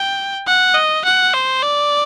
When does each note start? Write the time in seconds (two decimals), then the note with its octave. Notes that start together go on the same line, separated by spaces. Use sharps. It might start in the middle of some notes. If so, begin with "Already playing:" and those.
Already playing: G5
0.47 F#5
0.75 D#5
1.05 F#5
1.34 C5
1.63 D5